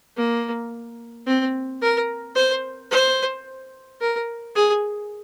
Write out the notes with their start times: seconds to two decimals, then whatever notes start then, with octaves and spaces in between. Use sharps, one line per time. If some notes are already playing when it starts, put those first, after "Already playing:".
0.17 A#3
1.27 C4
1.82 A#4
2.36 C5
2.91 C5
4.01 A#4
4.55 G#4